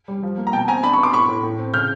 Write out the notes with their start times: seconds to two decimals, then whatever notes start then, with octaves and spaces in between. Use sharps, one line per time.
0.08 G3
0.23 F3
0.37 A#3
0.47 A#5
0.53 B2 G5 A5
0.68 C4 G#5 A#5
0.83 D4 A5 B5
0.93 B5 C#6
0.98 B3
1.03 C6 D6
1.13 A2 B5 C#6
1.28 A2
1.43 A2
1.59 C4
1.74 C#3 F6 G6